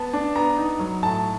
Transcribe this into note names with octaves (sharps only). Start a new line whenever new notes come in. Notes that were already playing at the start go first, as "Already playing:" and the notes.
Already playing: B3 A5
D4
B3 A#5
D#4
F#3
A2 A5